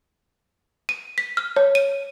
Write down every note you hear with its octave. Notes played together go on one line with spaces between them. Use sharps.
D#7
B6
F6
C#5
D#7